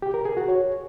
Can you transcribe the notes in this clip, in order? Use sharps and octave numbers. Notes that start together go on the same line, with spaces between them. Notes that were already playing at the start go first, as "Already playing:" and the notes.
G4
A#4
G#4
F#4
C#5